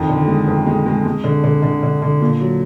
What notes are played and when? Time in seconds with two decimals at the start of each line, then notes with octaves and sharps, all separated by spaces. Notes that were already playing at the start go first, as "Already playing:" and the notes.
Already playing: F2 D#3
0.09 D3
0.28 G#3
0.47 F2
0.66 G#3
0.86 G#3
1.05 G#3
1.24 D3
1.44 D3
1.62 D3
1.83 D3
2.02 D3
2.21 A#2
2.41 F#3